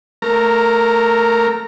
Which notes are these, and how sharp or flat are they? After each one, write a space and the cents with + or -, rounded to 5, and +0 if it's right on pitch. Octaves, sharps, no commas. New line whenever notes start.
A3 +0 A#4 +0 A#5 -25